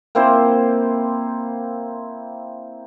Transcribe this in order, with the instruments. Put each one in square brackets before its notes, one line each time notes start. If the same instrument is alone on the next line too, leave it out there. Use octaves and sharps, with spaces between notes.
[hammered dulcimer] A#3 C4 E4 C5